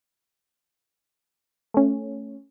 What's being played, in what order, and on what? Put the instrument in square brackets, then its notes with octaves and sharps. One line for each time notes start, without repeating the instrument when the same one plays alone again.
[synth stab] A3 C#4